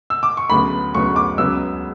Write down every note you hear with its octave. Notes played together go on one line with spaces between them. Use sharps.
E6
D6
C#6
D2 C#3 F#3 B3 B5
D2 C#3 F#3 B3 C#6
D6
C#2 C#3 F#3 B3 E6